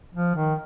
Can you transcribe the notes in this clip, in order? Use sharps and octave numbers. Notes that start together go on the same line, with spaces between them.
F3
D#3